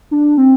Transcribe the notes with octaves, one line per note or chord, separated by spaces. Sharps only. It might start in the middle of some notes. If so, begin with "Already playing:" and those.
D4
C4